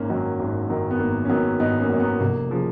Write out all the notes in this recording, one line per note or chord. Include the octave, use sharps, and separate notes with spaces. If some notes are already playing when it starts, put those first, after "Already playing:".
Already playing: G#1 A#3 C#4
F#2 D#3 F#3
G#1
F#2 D#3 F#3
B3
G#1 A#3
C#4
F#2 D#3 F#3 B3
G#1 B3 D#4
A#3 C#4
F#2 D#3 F#3
B3
F1 A#3
C#3 F3